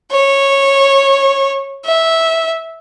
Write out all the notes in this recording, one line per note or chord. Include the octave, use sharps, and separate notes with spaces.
C#5
E5